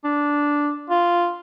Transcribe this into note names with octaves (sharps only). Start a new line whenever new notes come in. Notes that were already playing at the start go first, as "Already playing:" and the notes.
D4
F4